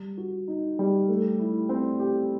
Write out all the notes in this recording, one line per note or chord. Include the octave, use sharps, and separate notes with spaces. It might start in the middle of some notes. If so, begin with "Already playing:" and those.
Already playing: G3
F#4
D#4
G3
A3
E4
C4
G4